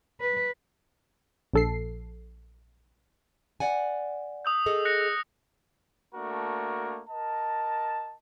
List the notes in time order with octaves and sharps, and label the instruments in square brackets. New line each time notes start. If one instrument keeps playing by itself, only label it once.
[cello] B4
[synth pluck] A#1 A4 C7
[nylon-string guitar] D5 F#5 G#5
[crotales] D#6 E6 G6
[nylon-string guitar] G#4 A4 D#5
[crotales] F#6 A#6 C#7
E6
[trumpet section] A3 A#3 D4 F#4 A#4
A#4 D#5 A5